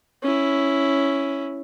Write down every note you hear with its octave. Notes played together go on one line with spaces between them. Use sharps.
C#4 E4